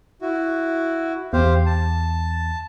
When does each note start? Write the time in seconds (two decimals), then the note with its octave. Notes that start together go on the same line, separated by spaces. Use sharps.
0.22 E4 F#4
1.33 E2 G4 C5 F5
1.66 A5